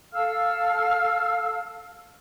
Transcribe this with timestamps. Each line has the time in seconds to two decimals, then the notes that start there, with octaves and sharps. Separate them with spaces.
0.13 A4 F5 E6 F6